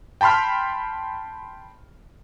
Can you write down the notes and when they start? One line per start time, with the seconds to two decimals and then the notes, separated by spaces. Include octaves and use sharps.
0.21 G5 A5 B5 C6 F6